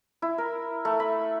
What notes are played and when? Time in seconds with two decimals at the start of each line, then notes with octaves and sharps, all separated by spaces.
0.22 E4
0.38 A#4
0.85 A3
1.00 B5